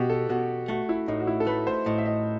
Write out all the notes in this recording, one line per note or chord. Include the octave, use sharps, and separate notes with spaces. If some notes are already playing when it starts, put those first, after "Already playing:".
Already playing: B2 F#4 G4
A4
B2 F#4
A3 F#4
E4
A2 D#4
F#4
E4
A4
A3 B4
C5
A2 D#5
E5
D#5